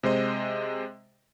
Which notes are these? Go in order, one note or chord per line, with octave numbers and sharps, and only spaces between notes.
C3 G#3 C5 D#5